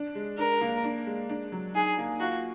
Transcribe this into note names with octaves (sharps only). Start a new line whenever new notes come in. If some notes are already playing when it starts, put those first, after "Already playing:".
Already playing: D4
G#3
D4 A#4
A#3
D4
G#3
D4
F#3
D#4 G#4
A#3
F4 F#4